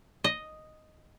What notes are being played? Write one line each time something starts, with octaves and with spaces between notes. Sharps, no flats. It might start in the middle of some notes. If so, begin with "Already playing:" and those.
D#5